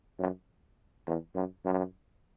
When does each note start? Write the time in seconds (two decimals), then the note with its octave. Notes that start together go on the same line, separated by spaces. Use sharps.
0.19 F#2
1.07 E2
1.35 F#2
1.64 F#2